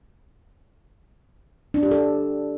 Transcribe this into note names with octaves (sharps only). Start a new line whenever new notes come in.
D4
G4
A4